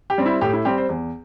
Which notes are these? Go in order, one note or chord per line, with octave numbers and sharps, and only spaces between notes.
G4
G3 C4
E4
A2 G4
E4
G3 C4 G4
C5
E2